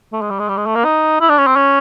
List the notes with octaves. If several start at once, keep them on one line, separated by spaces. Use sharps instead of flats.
A3
G#3
G3
G#3
G3
G#3
A3
A#3
D#4
E4
D4
C#4
C4
C#4